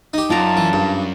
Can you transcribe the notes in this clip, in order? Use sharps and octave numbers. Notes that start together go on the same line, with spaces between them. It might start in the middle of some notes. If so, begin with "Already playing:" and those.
D#4 G4
F#2 F4 D5 A5 A#5
E3
G2